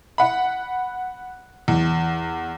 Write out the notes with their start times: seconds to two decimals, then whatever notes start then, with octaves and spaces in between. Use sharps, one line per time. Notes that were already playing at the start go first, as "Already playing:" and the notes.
0.18 F#5 B5
1.68 E2